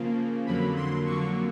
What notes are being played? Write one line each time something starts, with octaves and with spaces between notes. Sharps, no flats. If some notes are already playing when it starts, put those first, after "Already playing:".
Already playing: C#3 F3 A#3
F2 D3 F#3 A#3 B5
C6
F2 D3 F#3 A#3 C#6